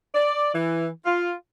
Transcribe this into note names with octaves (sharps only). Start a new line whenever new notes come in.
D5
E3
F4